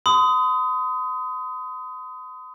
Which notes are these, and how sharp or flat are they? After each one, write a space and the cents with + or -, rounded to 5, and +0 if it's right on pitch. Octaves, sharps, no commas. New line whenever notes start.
C6 -45 D#6 +15